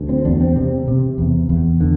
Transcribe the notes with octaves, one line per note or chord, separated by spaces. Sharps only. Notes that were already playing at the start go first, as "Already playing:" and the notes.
Already playing: D2
C4
E2 D4
C4
C3 C4
C3
E2
E2
D3